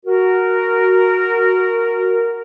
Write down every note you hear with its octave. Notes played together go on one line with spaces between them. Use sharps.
F#4 A#4